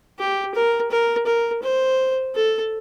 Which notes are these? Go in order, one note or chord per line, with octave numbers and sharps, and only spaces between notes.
G4
A#4
A#4
A#4
C5
A4